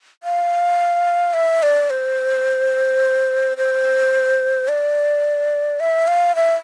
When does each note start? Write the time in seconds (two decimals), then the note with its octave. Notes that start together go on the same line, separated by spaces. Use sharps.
0.23 F5
1.34 E5
1.63 D5
1.90 C5
3.57 C5
4.68 D5
5.80 E5
6.07 F5
6.36 E5